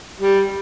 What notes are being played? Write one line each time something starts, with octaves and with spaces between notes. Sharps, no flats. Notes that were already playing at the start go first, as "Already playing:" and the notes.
G3